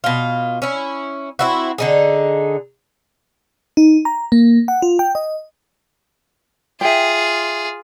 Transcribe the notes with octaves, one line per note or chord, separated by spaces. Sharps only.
B2 F4
C#4 E4
C4 E4 F#4
D3 D#4 G#4
D#4
A#5
A#3
F#5
F4
G5
D#5
F4 G#4 E5 G5